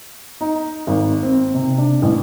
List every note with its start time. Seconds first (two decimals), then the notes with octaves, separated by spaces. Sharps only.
0.41 D#4
0.87 G#1
1.23 C4
1.54 C3
1.78 D4
2.02 A1